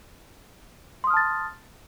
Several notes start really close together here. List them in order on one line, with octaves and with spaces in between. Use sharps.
C6 D#6 F6 A5 A6